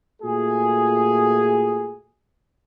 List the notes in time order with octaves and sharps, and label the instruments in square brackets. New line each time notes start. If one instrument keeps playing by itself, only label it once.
[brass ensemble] A#2 A3 F4 F#4 G#4